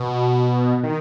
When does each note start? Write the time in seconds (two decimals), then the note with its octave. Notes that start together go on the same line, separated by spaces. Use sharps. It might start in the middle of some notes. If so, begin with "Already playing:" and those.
Already playing: B2
0.83 D#3